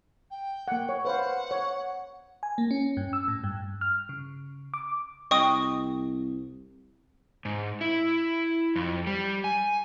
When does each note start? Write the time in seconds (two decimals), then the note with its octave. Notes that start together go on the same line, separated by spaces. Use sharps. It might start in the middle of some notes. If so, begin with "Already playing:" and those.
0.31 G5
0.68 A#3 F#5
0.89 C#5
1.05 B4 C5 F5 F#5
1.51 C#5
2.43 G#5
2.58 A#3
2.71 C#4
2.97 G2
3.13 E6
3.28 A2
3.44 G2
3.81 F6
4.09 C#3
4.74 D6
5.31 C2 D#5 G5 C#6 D#6
7.45 G#2
7.81 E4
8.76 F2
9.07 G3
9.44 G#5